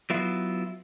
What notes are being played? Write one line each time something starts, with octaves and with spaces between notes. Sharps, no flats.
F#3 B3 E4 F4